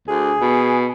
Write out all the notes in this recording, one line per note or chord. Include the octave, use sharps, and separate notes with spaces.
D2 G#4
B2